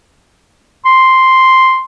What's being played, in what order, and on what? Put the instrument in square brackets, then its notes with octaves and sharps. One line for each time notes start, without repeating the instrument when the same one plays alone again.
[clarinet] C6